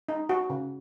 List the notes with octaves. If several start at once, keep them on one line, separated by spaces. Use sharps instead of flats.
D#4
F#4
C#3